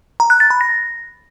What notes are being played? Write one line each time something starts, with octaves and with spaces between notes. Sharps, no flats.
A#5
F#6
A6
B5
A#6